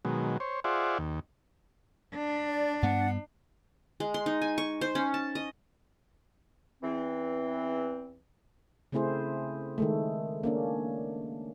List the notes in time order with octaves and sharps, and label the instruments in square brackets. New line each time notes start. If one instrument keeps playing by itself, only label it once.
[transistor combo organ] B2 D#3 F#3 G#3
C5 C#5
F4 G#4 C5 D5 E5 F#5
D#2
[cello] D4
[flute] D5
[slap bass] G2 B3 [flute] F#5
[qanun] G#3
C6
D#4
G#5
C#6
C5
C#4
A5
D#5
[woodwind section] E2 E3 C4
[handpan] C#3 A3 C4 E4 G#4 C5
D#3 G#3 A3
A#3 C#4 D4